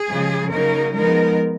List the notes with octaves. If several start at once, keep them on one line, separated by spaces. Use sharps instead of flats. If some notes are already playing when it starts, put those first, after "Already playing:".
Already playing: G#4
C#3 F3 G#3
C#3 F#3 A#3 D#4 A#4
F3 G#3 B3 D#4 A#4